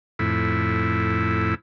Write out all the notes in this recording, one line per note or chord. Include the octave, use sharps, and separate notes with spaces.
F2 A2 E4